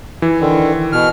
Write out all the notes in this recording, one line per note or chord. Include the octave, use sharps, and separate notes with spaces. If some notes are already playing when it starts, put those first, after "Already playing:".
E3
D3 D#3
B2 F6